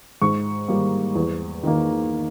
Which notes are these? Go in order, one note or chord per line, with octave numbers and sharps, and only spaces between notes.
G#2 C#6
G3 A#3
E2
D#3 A#3